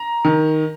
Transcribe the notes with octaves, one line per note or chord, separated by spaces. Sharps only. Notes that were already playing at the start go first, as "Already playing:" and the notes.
Already playing: A#5
D#3